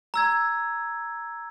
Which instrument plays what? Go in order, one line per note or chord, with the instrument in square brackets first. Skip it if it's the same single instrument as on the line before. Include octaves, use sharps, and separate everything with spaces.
[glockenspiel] A#5 E6 G#6